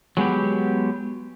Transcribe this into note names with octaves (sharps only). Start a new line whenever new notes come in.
F#3 G#3 B3 G4